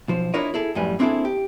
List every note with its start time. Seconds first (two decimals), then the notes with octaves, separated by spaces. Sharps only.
0.08 B1 F3 C5
0.34 D4 E4 F4 A#4 C#5 D#5
0.54 E4 G#4 A4
0.75 F#2 A2 F3 G3 B4 G#5
0.99 A#3 C4 D4 E4 G#4 A4
1.25 G4